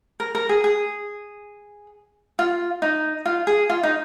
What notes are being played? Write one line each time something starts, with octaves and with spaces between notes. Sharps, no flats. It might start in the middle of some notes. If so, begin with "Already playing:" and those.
A#4
A#4
G#4
G#4
F4
D#4
F4
G#4
F4
D#4